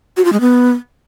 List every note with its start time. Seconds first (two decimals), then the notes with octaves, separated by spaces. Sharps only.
0.17 F#4
0.25 F4
0.33 G#3
0.40 B3